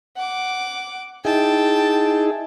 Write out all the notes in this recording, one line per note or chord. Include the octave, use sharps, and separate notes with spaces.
F#5 D6
D#4 E4 G#4 G5 A5